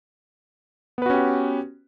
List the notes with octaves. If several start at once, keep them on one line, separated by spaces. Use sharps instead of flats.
B3 C#4 F#4 G4 B4